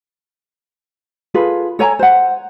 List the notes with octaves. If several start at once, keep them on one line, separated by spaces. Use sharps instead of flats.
F4 G#4 A4 B4
A4 C#5 G#5 A#5
C5 F#5